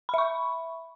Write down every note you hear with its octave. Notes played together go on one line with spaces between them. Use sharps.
E5 B5 C#6